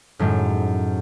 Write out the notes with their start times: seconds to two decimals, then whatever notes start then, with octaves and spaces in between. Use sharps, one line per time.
0.19 F#2 A2 D#3 G#3